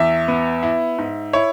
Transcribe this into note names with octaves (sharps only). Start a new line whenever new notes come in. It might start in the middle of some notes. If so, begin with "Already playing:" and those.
Already playing: E2 E5
B3
E4
G#2
E4 C#5